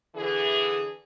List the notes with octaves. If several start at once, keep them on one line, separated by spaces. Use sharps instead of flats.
D3 E3 G#4